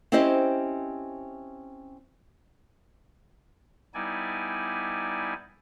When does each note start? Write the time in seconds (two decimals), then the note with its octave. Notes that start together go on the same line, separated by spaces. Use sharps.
0.12 C4 C#4 E4 G4 C5 D#5
3.94 G3 B3 D#4 E4 D5 G#5